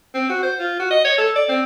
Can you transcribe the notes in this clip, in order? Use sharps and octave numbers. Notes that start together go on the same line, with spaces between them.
C4
F#4
C5
F4
F#4
D#5
C#5
A4
D5
C4